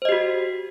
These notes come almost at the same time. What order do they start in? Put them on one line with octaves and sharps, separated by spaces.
C5 D#5 G4 F#4